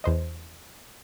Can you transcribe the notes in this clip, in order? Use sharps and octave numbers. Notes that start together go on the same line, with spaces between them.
E2 C5 D#5